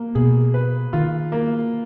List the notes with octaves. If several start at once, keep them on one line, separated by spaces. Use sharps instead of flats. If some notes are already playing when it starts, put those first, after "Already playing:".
Already playing: A#3
B2 G#4
B4
D#3 F4
A#3